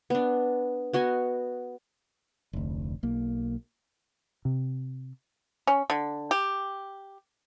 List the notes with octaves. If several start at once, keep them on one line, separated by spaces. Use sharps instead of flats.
B3 D4
B3 F#4 D#5 G#5
F1 D2
B1 A#3
C3
C#4
D3
G4